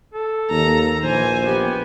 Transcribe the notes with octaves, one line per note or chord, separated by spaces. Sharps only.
A4
D#2 A#5
A#1 E3 C5 G#5
B3 G4